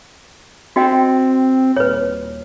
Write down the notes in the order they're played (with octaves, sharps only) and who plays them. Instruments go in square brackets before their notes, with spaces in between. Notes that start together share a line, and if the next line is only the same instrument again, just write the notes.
[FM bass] C4 [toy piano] F#4 D#5 G5
[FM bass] D#1 [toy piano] B4 C#5